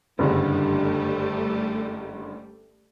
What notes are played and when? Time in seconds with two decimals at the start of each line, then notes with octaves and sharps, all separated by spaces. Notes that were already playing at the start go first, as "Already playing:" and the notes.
0.19 F#1 G2 D3 G3 A3